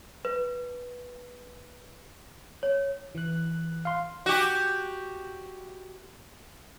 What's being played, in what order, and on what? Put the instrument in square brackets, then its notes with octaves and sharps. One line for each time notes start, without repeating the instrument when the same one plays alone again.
[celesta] B4
C#5
[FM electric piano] E3 F#6
[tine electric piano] F5 C6
[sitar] F#4 G4